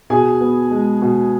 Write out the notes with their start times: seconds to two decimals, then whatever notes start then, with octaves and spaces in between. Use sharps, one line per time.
0.10 B2 G#4 G#5
0.41 B3
0.71 G#3
1.02 B2